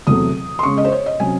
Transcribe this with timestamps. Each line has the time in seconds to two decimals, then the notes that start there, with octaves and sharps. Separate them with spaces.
0.07 E2 C3 F#3 A3 D#6
0.59 C6
0.63 C#3 G#3 C#4 C#6
0.78 D#5
0.85 C5
0.92 C#5
1.06 D#5
1.20 C3 F#3 C#4 G#5